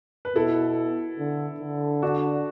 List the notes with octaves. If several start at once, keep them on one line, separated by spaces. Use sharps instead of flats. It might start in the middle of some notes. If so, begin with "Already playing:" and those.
B4
B2 E4 A4
D3
D3
D4 F#4